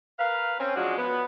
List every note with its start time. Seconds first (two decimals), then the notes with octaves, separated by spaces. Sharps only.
0.19 A#4 B4 F5
0.59 C4 C#4
0.76 F3 F#3 G#3 D4 F#4
0.98 B3